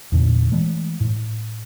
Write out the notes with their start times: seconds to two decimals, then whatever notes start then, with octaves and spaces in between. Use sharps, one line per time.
0.12 E2 A#2 D3
0.52 E3 G#3 A3
1.00 A2